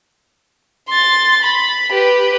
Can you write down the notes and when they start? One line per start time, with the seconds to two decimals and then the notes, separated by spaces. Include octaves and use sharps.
0.90 C6 A6
1.42 B5
1.93 G4 B4